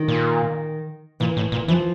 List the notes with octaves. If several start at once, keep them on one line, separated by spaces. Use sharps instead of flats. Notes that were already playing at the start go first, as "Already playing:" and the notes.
Already playing: D#3
A#2
A#2 E3
A2
A#2
E3 F3